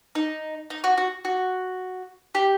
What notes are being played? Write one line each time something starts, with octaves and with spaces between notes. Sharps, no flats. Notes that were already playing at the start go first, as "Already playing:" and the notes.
D#4
D#4
F#4
F#4
F#4
G4